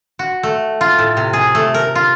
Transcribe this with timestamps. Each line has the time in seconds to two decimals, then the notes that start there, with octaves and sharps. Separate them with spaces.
0.19 F#4
0.43 A3
0.81 F4
0.98 A2
1.17 C3
1.33 G#4
1.55 A3
1.74 A#4
1.95 F4